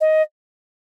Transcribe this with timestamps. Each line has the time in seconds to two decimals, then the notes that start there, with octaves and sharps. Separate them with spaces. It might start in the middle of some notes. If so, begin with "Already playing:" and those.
0.01 D#5